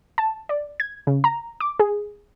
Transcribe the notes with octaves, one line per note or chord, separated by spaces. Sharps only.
A5
D5
G#6
C#3
A#5
D6
G#4